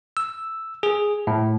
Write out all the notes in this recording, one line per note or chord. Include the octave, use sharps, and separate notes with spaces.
E6
G#4
A2